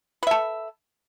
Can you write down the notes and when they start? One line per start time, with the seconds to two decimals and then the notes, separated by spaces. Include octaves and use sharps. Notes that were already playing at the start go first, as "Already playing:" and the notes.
0.23 B4
0.27 E5
0.31 A4